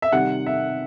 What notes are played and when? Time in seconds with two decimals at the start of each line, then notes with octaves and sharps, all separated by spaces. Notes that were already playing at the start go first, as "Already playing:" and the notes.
0.02 E5
0.12 C3 D#3 G3 F#5
0.46 E5